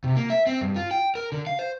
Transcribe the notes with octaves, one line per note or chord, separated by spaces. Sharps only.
C3
A#3
E5
C4
G2
F4
G5
A#4
D3
F5
C5